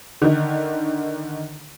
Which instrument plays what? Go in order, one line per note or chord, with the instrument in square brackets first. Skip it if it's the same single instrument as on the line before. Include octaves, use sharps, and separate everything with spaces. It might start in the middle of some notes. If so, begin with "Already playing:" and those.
[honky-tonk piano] D3 D#3